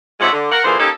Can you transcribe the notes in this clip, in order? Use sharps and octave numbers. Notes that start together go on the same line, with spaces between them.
C3 G#3 F4 C#5 E5 F#5
D3
A#4 F#5
A#2 D3 E3 A#3 G#4 C5
A#3 C#4 D#4 G4 A4